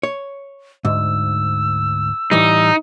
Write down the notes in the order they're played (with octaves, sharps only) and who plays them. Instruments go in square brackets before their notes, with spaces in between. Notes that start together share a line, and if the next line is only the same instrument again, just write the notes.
[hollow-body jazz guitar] C#5
[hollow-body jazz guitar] D2 G#2 [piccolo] E6
[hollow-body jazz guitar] A2 E3 G3 [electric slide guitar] D#4